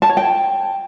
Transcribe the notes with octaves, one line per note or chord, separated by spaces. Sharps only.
A5
C#5
G5